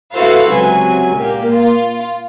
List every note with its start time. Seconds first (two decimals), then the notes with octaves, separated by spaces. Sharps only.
0.13 E4 F#4 A4 B4 C5 F5
0.50 C#2 C3 F#3 G#5
1.14 A#2 A#3 G4
1.53 F4